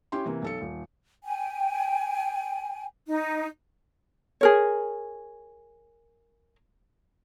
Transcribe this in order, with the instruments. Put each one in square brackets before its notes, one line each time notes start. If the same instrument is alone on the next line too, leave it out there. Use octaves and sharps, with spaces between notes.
[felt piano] C#4 E4 G4 C6
C3 E3 A#3
B1 A4 C#7
D#1
[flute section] G5 G#5
D#4
[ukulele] G#4 A#4 C#5